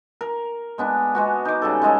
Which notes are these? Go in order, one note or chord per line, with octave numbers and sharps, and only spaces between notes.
A#4
G#3 B3 D4
G#3 B3 F#4
D#4 D6
C#3 G3 A4
C#3 G#3 D#5 A5